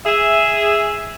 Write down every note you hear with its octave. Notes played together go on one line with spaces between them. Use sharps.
G#4 E5